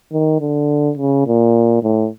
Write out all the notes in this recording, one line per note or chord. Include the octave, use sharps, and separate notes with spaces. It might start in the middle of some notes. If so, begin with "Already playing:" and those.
D#3
D3
C#3
A#2
A2